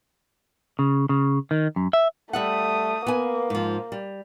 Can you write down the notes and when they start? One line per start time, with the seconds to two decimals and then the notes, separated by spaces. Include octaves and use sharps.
0.79 C#3
1.09 C#3
1.51 D#3
1.76 F#2
1.93 E5
2.33 G3 A3 E5 F#5 D#6
3.07 A#3 B3 G#5
3.50 G#2 F3
3.92 G3